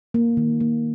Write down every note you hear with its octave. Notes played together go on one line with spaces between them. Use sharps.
A#3
D#3
A#3